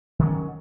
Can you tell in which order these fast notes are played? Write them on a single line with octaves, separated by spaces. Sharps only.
D#3 F#3 C#4